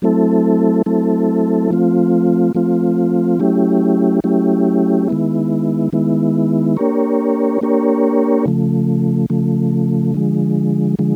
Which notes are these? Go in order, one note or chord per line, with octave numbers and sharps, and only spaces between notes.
F#3 A3 C4 E4 A4
F#3 A3 C4 E4 A4
F3 A3 C4 F4
F3 A3 C4 F4
F#3 A3 C#4 E4 G4
F#3 A3 C#4 E4 G4
D#3 G#3 B3 E4
D#3 G#3 B3 E4
A#3 D4 G4 A#4 C#5
A#3 D4 G4 A#4 C#5
C#3 F3 A3
C#3 F3 A3
D3 F3 G#3
D3 F3 G#3